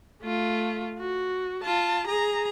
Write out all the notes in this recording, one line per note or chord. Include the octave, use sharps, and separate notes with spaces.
A3 F4
F#4
F4 A5
G#4 A#5